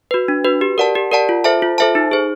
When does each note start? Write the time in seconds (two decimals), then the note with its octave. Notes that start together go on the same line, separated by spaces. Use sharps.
0.11 F#4 B4
0.28 D4
0.44 F#4 B4
0.61 G4
0.78 A#4 D5 F#5 A5
0.95 G4
1.12 A#4 D5 F#5 A5
1.29 F4
1.44 A4 C5 E5 A5
1.62 F4
1.78 A4 C5 E5 A5
1.95 D#4
2.11 G#4 C5